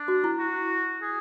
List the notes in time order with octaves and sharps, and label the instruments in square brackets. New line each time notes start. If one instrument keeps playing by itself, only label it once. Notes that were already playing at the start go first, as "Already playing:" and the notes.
Already playing: [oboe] D4
[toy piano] F#4
E4
[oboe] F#4
G#4